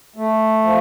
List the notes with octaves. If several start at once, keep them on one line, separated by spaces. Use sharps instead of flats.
A3
F3